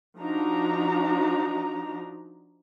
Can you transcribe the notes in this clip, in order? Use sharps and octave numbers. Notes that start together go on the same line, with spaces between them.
F3 D4 D#4 F#4 A#5